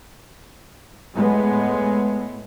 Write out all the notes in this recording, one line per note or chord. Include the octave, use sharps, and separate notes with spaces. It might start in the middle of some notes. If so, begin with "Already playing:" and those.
A2 G#3 B3